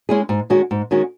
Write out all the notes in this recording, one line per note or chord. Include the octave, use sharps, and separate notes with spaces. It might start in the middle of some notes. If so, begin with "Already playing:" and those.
G#3 C#4 E4 G#4
G#2
D#3 G#3 C#4 F#4
G#2
D#3 G#3 C#4 F#4